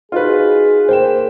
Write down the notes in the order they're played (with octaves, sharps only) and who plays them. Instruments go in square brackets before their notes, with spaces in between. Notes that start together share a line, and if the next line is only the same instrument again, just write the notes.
[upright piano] D#4 F#4 [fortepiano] F4 B4 [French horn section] G#4
[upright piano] A#3 G5 E7 [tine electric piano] C5